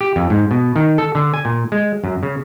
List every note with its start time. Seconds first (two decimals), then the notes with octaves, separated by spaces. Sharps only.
0.01 G4
0.16 F2
0.30 G#2
0.51 B2
0.76 D#3
0.98 A4
1.15 D3
1.34 G#5
1.45 A#2
1.72 G#3
2.04 F#2
2.23 C#3